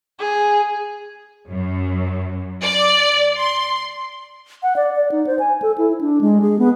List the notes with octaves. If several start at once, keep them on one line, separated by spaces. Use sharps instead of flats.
G#4
F#2
D5
C6
F#5
D5
D5
D#4
C5
G#5
A4
E4
D4
G#3
G#4
B3